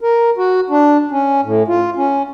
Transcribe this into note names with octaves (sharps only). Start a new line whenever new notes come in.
A#4
F#4
D4
C#4
A2
F4
C#4